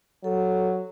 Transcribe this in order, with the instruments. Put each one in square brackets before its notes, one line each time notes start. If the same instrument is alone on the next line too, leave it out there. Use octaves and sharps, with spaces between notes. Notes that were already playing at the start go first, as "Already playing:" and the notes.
[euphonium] F#3 [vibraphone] A4